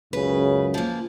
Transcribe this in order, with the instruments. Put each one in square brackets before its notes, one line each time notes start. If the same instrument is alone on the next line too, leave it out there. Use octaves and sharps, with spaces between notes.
[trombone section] C#2 F#2 C#3 [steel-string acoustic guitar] B4
[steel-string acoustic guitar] F3 A#3